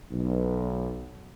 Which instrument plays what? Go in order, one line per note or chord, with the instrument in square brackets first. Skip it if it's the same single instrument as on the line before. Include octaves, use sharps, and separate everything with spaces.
[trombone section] B1